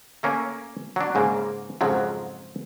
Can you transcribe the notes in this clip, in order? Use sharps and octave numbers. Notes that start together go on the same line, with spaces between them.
A3 A#3 C#4
F#3 D4
G#2 C#3 A#3
F2 G#2 C#3 F3 F#3